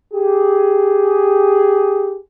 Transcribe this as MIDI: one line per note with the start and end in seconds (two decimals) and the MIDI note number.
0.13 2.18 67
0.13 2.18 68